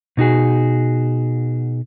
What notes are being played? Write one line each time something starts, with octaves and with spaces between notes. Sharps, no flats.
B2 D#4 F#4 G#4